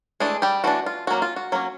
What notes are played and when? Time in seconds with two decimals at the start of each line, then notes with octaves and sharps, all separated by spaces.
0.20 E3 G#3 A3 D4 G#4
0.42 G3 G4
0.64 E3 A3 D4 F#4
0.86 F4
1.07 F#3 A#3 C#4 F#4
1.22 F4
1.36 F#4
1.52 F#3 A#3 C#4